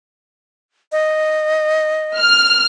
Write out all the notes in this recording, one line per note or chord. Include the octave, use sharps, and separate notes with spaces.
D#5
F6